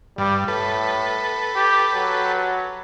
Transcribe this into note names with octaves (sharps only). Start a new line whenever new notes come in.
G2 G3
A2 A4 B4
G4
F#3